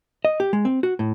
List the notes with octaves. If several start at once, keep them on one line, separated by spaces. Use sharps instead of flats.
D#5
G4
G#3
C4
F#4
A2